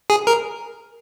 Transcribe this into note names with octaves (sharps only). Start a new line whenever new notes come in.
G#4
A#4